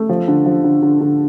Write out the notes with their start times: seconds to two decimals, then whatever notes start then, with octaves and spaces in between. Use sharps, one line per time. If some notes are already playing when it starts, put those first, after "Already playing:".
Already playing: A3
0.09 F3
0.28 D3
0.46 F3
0.64 D3
0.82 D3
1.01 D3